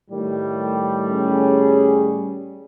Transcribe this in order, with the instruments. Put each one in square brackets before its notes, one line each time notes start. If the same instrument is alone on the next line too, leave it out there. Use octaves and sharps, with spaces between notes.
[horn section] A2 D#3 G3
[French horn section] C#4 G#4